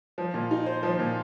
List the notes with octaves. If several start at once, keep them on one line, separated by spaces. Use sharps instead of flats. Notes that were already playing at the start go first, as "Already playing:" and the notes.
F3
A#2
D#4
C5
F3
A#2